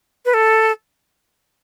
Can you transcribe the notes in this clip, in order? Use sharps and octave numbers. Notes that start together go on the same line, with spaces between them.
B4
A4